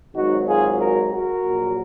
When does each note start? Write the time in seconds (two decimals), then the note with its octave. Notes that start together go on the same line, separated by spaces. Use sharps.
0.15 G#1 G#2 F#3 D#4 F#4
0.48 F4 G#4
0.80 F#4 A#4
1.11 F#4 A#4
1.44 A#1 A#2 F#3